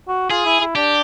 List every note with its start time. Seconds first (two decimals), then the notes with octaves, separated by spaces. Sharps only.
0.08 F#4
0.31 F4 G#4
0.46 E4
0.61 E4
0.75 D4 G4